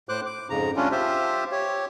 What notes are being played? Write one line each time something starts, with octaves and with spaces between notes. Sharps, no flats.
A2 C5 D6 F#6
D6
F2 G#2 C#3 A#5
G3 A3 C#4 D4 F4
F4 G4 C5 E5
G4 C#5